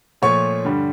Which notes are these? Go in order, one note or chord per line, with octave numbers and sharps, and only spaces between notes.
A#2 F3 A3 C#5 C#6
G2 D3 G3